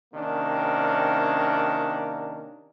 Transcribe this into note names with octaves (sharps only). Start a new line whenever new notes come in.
C3 D#3 A#3 C#4 D4